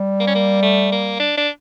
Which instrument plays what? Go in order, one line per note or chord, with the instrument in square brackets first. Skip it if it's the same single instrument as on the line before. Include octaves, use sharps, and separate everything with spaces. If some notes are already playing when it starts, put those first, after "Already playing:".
Already playing: [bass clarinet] G3
[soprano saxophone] A#3
C#4
A#3
A3
A#3
D4
D4